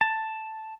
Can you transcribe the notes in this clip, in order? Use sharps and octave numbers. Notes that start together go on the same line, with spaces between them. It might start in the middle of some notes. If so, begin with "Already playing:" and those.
A5